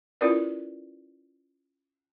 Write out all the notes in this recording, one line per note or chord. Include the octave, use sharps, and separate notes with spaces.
C#4 E4 F4 A#4 B4 D5